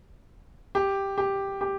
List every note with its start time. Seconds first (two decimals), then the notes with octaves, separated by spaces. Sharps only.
0.75 G4
1.18 G4
1.61 G4